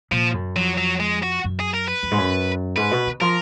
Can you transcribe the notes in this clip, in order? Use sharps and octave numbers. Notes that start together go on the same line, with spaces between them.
A#2 F3
F#2
F2 F#3
F#3
G#3
F#4
F#2
G#4
A#4
B4
F#2
G#2
F#2
G#2 B4
B2
D#3
F3 A#4